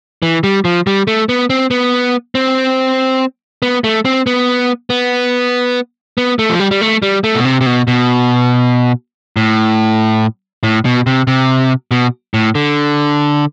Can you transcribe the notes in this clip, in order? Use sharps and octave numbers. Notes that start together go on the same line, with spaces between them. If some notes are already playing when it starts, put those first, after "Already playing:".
E3
G3
F3
G3
A3
B3
C4
B3
C4
B3
A3
C4
B3
B3
B3
A3
F3
G3
G3
A3
G3
A3
B2
C3
C3
B2
B2
A2
A2
B2
C3
C3
B2
A2
D3